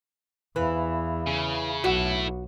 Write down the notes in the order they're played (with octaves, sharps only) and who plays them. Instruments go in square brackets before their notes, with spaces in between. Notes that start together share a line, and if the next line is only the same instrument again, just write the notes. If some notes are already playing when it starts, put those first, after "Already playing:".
[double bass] E2 [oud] E3 [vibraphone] E5 F5 B5
[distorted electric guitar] C#3
[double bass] B1 [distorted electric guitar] E4 A4 [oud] F#4